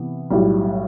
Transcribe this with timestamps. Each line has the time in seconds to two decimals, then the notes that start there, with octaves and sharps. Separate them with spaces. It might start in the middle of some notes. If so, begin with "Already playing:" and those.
Already playing: C3 E3 B3
0.30 B1 A2 G3